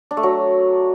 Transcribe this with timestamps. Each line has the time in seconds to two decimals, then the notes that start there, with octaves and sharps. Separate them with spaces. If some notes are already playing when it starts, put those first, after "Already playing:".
0.11 D4
0.17 A3
0.23 F#3